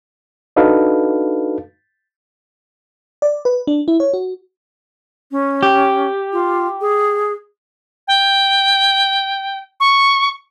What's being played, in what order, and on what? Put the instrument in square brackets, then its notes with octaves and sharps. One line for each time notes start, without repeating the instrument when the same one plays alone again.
[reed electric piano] D4 D#4 F#4 A4 B4 F5
[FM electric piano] D5
B4
D4
E4
C#5
F#4
[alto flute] C#4
[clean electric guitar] G4
[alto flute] F4
G#4
[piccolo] G5
C#6